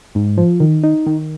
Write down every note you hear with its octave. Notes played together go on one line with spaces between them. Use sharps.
G#2
F3
D#3
D#4
D#3